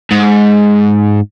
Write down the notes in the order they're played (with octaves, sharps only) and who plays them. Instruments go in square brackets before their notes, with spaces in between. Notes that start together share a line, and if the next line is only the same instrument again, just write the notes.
[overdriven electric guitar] G#2